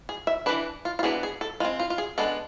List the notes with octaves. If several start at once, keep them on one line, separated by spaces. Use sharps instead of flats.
G#4
E5
E3 G#3 D4 B4
F4
F4
E3 B3 D4 G#4
G#4
A4
G#3 C4 F4
F4
F4
G#4
G#3 B3 D4 A4